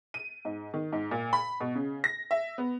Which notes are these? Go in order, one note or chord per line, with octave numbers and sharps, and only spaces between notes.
D#7
G#2
D#3
G#2
A#2
B5
B2
C#3
A#6
E5
B3